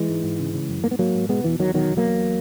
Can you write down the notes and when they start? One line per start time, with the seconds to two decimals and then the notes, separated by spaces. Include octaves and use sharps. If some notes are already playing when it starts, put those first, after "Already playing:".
Already playing: E3 G#3
0.09 G#2
0.23 G#2
0.39 C#3
0.54 C#3
0.69 F#2
0.84 G#2 A#3
0.91 B3
0.99 G#2 F#3 A#3
1.15 G#2
1.29 B2 G#3 B3
1.44 E2 E3
1.60 E2 D#3 F#3
1.74 B2 D#3 F#3
1.89 E2
1.97 F#3 A#3
2.05 E2